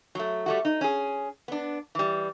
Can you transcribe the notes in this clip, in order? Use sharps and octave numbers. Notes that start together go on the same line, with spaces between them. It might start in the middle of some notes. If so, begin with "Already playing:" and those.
F#3 A3
G3 A3 F#4
D#4
C#4 G#4
B3 D4
E3 G3